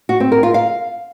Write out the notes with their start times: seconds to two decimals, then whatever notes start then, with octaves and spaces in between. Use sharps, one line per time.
0.09 F#4
0.20 C4
0.32 A#4
0.43 F4
0.54 F5